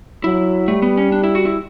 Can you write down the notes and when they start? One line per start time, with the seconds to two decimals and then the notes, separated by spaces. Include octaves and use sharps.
0.23 F#3 E4
0.68 G3 A3
0.82 B3
0.97 C#4
1.12 D4
1.24 E4
1.35 F#4
1.45 E4